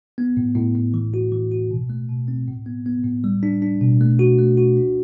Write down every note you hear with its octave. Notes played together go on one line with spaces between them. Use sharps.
B3
A2
A2
A2
E3
F#4
E3
F#4
B2
A3
B2
C4
A2
B3
B3
A2
G3
D4
D4
B2
A3
F#4
A3
F#4
D4